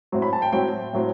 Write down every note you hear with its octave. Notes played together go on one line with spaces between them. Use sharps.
A2 F#3 C4
B5
A5
G5
A2 F#3 C4 G5
A2 F#3 C4